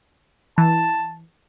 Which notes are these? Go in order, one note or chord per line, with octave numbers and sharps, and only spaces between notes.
E3 A5